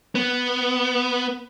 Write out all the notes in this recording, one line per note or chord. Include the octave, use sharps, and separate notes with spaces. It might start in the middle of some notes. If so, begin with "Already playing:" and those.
B3